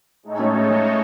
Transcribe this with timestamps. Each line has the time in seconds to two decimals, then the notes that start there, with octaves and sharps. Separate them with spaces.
0.23 A2 G#3 D#4 A4 C#5
0.39 A3 C#4
0.55 A3 C#4
0.70 A3 C#4